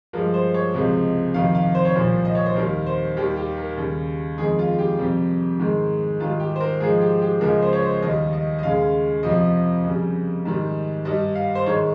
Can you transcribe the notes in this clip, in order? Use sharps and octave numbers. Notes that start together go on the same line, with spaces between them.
G2 F3 G#3 A#4
C5
C#5
C#2 C3 F3 G#3
F2 C3 D#3 F5
F5
C5
C#5
C2 A#2 F3 C5
D#5
C#5
C5
D#2 D#3 G3 A#4
C5
D#2 D#3 G3 G4
G4
A#4
D#2 C#3 G3
F2 D#3 G#3 G#4
F4
G4
F2 C3 G3
G#2 D#3 G#3
G#2 D#3 G3 F4
G4
C5
A#4
G#2 F3 G#3 G#4
G4
G4
C#2 C#3 F3 G#3 A#4
C5
C#5
C5
D#2 D#3 G3 D#5
D#5
D#5
D#2 C#3 G#3 F5
F2 C3 F3 D#5
F2 C#3 G3
G#2 D#3 G3
G2 G3 D#5
F5
C5
G#2 D#3 G#3 C#5